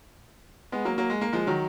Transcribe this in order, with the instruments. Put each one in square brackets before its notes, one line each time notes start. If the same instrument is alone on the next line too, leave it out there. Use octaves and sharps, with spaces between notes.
[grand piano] G#3 B3
F#3 A#3
F#3 A#3
G#3
A#3
F3 G#3
D#3 F#3